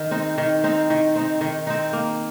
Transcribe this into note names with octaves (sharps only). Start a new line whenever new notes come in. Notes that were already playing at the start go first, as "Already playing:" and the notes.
Already playing: D#3
C4 D#4
D#3
C4 D#4
D#3
C4 D#4
D#3
C4 D#4
A#3